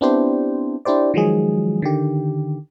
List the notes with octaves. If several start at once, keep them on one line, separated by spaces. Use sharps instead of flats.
B3 C4 D4 E4 G4 C5
D4 E4 G4 C5 D5
D#3 F3 F#3 G#3 G#4
D3 D#3 G4